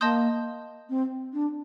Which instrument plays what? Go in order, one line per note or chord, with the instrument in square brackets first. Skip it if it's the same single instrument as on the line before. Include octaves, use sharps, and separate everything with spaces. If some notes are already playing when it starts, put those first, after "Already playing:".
[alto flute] A#3 [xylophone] D#5 A5 C6 D#6 G6
[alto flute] C4
D4